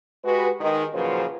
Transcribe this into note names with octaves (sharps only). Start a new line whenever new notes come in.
G#3 F#4 G4 B4
D#3 G#3 D#4
A#2 C#3 F3 F#3 B4 C5